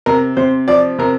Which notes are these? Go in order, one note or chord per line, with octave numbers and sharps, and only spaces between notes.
C3 A#4
C3 C5
F3 D5
C3 A#4